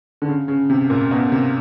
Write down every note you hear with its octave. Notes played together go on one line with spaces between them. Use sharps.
D3
C#3
C#3
C3
A#2
B2
C3